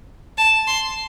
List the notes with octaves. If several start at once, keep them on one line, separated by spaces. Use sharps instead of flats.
A5
C6